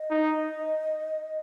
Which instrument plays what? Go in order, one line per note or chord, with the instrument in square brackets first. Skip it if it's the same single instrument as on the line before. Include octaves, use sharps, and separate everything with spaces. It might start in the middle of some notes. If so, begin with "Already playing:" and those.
Already playing: [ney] D#5
[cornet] D#4